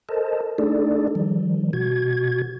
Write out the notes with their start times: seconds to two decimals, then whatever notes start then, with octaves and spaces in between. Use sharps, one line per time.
0.09 A4 A#4 C5 D#5 A5
0.58 A3 D4 D#4 G#4 A4 D5
1.15 D#3 F3 G3
1.73 B2 F#4 G#6